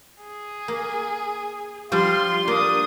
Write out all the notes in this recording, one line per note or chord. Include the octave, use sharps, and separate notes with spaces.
G#4
A#3
F3 G3 F4 C6
A#3 D4 D#6